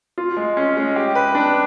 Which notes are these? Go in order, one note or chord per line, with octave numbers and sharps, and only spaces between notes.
F4
G#3
C#4
G#3
G4
B4
D4